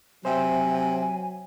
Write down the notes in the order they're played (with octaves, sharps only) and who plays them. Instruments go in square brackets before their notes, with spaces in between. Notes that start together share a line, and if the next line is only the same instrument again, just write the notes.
[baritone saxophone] C3 [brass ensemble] F#3 [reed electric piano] C5 E5 G5 [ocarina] G#5